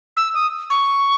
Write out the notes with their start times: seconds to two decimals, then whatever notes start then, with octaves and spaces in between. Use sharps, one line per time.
0.17 E6
0.34 D#6
0.70 C#6